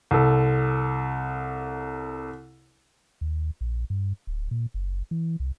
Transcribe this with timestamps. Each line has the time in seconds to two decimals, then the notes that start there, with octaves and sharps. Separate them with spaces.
0.11 C2 A4
3.21 D#2
3.61 A#1
3.90 G2
4.27 D1
4.51 A#2
4.74 F#1
5.11 E3
5.40 C2